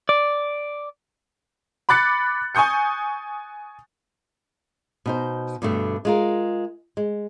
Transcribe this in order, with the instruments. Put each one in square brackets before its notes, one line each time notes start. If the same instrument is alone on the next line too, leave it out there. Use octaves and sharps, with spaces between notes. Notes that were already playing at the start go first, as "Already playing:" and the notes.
[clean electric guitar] D5
[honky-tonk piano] B5 D6 F#6 A6 C#7
G#5 C#6 D#6 G6 C#7
[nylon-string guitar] B2 D#4 C5
G2 B2 D3 A3
G#3 F4 A#4
G#3